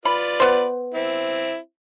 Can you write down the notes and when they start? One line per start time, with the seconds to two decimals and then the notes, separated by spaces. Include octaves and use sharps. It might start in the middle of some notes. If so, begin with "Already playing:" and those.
0.05 F4 B4 D5 B5
0.40 B3 C5
0.94 C4 E4